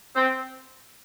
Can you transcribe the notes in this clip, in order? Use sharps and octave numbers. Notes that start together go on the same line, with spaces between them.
C4